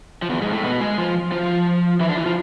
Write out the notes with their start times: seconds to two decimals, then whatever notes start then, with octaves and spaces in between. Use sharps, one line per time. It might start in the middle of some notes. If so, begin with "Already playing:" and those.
0.22 F3
0.30 E2 E3
0.41 G#2 G#3
0.52 A2 A3
0.64 B2 B3
0.80 G#3 G#4
0.98 F3 F4
1.32 F3 F4
2.00 E3 E4
2.09 D3 D4
2.17 E3 E4
2.26 F3 F4